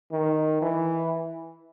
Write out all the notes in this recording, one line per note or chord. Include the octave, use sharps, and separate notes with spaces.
D#3
E3